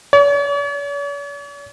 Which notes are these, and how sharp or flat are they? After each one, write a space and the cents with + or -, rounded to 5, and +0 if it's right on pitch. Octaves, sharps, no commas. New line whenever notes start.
C#5 +45